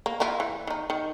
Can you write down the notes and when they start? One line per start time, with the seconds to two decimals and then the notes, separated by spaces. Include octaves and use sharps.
0.06 A#3
0.20 A#3 E4 F4
0.40 E3
0.67 D#3 D#4
0.90 D#3